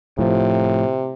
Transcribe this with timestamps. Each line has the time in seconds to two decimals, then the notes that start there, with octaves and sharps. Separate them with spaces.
0.19 A2 C3 F3